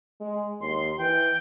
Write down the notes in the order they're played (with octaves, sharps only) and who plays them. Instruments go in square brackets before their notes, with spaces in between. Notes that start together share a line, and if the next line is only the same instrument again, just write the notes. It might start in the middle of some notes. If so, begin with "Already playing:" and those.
[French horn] G#3
[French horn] D#2 [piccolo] C6
[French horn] E3 [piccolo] G5